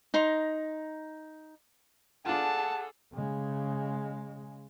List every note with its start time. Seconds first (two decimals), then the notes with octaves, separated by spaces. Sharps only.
0.14 D#4 A#5 C6
2.26 D4 F4 G#4 A4 F#5 A5
3.13 C#3 G#3